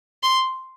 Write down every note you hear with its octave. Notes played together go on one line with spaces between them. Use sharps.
C6